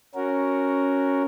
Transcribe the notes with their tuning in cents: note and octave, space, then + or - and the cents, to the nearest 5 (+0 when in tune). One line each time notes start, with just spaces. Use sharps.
C#4 +0 F#4 +0 A#4 +0